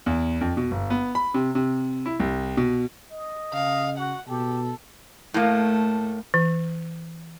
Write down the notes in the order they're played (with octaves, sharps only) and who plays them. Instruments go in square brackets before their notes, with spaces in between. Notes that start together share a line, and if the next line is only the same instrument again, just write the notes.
[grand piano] E2
F2
B2
G1
B3
B5
C3
C3
E4
C2
B2
[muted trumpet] D#5
[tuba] C#3 [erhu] F5
[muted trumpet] F#4 [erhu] F#5
[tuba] B2 [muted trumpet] G4 [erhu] A4
[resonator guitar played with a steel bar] A2 A#3 [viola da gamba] A3
[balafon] E3